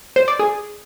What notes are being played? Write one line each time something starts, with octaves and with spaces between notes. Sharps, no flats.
C5
D5
G#4